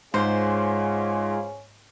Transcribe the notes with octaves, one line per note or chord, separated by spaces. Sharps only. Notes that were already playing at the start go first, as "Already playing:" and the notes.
G#2 G#3 C#4 F4 G#4 C5